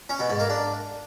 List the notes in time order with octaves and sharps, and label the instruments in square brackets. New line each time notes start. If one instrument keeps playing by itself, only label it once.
[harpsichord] C#4
B2
G#2
A#3
D4